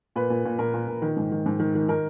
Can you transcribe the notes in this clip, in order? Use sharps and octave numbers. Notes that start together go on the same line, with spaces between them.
A#2 B4
A#2
A#2
A#2 A#4
A#2
A#2
D#3
G#2
D#3
G#2
D#3
D#3
D#3 A#4